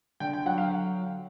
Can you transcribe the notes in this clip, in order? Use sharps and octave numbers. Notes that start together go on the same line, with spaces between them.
D3 G5
G5
F#3 F#5
F5